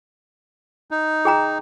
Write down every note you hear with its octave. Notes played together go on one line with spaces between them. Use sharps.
D#4
G#4 G5 A#5